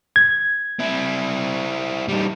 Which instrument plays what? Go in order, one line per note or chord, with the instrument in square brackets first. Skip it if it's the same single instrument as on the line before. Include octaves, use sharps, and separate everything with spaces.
[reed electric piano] G#6
[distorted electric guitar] C4 E4
G3 D#4